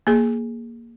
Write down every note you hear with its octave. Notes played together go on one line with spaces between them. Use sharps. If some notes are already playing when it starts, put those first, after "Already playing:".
A#3 G#4